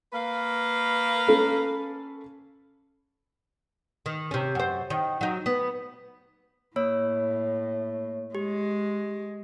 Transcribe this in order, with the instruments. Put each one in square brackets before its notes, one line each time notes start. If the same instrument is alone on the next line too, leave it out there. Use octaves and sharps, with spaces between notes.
[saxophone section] A#3 B4 F5
[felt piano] C#4 A4 B5
[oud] D#3
C3 C#4
F#2 C5
D#3
F#3 D#4
B3
[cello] A2 [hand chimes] A#3 C#5 E6
[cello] G#3 [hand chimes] G4